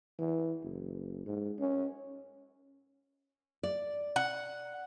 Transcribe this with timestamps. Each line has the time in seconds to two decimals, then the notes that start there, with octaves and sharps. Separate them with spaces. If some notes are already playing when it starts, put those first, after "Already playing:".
0.19 E3
0.63 F#1
1.26 G#2
1.59 C#4
3.63 D5
4.16 F#5